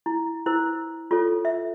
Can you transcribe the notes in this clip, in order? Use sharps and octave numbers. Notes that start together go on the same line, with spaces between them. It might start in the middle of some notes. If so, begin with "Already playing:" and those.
E4
E4 A#4 C5
F4 A4 C#5
E5